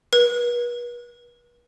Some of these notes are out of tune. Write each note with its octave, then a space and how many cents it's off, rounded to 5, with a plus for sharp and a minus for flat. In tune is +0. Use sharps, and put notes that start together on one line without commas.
B4 -40